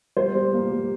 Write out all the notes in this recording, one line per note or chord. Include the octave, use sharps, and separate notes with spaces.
G3 C5
G3
A#3
G3